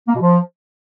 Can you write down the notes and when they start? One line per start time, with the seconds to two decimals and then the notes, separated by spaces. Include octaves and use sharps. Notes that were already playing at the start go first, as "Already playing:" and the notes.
0.08 A#3
0.15 B2
0.21 F3